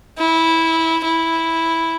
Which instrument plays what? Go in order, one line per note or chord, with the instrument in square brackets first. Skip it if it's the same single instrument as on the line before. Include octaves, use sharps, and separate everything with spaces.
[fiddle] E4
E4